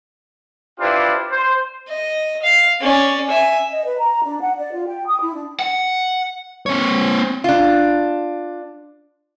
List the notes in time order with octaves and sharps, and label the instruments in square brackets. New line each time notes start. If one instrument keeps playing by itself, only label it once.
[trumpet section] D4 E4 F4 G4 B4 C5
C5
[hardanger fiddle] D#5
F5
C#4 D5
E5 G#5
[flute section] D#5
B4
A#5
D4
F#5
D5
F4
G5
D#6
E4
D4
[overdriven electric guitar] F#5
[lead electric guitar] C4 C#5
[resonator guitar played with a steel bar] D4 F4